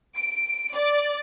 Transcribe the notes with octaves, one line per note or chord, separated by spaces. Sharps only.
D7
D5